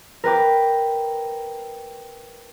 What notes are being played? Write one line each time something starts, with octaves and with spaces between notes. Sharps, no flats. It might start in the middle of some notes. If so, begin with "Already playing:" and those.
A#4 B4 G5 D6